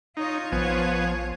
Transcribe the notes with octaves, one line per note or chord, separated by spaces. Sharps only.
D#4 F4 C#5
A#1 F3 B3 G#5